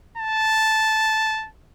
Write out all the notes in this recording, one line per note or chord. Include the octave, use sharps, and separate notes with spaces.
A5